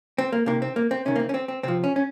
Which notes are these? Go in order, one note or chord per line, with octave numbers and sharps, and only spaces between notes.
C4
A#3
C3 D#3 A#3
C4
A#3
C4
C3 D#3 C#4
A#3
C4
C#4
C4
C4
C3 F3 C4
C#4
C#4